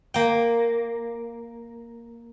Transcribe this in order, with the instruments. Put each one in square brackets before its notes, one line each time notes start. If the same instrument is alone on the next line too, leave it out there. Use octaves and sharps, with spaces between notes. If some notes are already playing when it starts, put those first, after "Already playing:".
[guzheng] A#3 G5